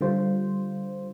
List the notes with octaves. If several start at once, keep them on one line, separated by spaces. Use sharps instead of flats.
D3 G3 F4 C5